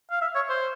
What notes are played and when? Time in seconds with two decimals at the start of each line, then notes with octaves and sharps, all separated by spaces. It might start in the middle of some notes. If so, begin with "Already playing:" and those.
0.11 F5
0.21 E5
0.35 C#5
0.50 C5